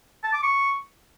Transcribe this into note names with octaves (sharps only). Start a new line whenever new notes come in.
A5
D6
C#6